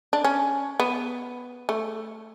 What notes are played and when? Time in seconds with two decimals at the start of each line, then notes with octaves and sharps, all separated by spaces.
0.13 D4
0.24 C#4
0.80 B3
1.69 A3